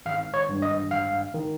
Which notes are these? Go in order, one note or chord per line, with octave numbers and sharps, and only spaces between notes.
G#1 F5
C#5
G2
D#5
G#1 F5
D#3